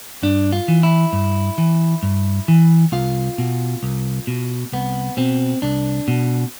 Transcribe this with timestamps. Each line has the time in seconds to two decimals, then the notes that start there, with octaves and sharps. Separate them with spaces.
0.23 G2 D4
0.52 F4
0.68 E3
0.83 E4
1.13 G2
1.58 E3
2.03 G2
2.48 E3
2.92 C2 F4
3.38 B2
3.83 C2
4.27 B2
4.73 C2 B3
5.17 B2 C4
5.62 C2 D4
6.08 B2